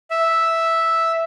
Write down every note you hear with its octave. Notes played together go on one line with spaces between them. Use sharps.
E5